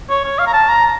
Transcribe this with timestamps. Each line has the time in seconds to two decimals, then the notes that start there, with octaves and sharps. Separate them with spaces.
0.10 C#5
0.25 C#5
0.39 F5
0.47 A#5
0.53 A5
0.69 A#5